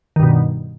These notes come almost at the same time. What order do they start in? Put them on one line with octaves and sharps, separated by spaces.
D#3 G2 B2